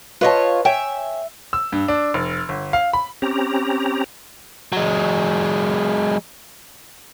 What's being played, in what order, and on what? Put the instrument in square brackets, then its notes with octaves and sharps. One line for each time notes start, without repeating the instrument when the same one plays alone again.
[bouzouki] F4 F#4 C#5 [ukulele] B4 D#5 A5
[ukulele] C#5 G5 G#5 [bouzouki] E5
[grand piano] E6
G2
D4
F1
G1
F5
B5
[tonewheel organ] C4 C#4 G4 A#5
[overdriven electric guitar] F#3 G#3